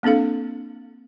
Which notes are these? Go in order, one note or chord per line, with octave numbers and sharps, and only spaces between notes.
A#3 C4 D4 A4 F5